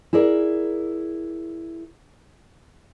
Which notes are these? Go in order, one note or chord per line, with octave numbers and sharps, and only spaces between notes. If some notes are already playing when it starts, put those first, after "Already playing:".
E4 G#4 A#4 D5